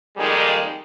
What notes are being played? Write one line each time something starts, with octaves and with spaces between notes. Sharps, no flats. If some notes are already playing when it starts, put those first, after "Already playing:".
F2 D#3 G3 G#3 A#3 G#4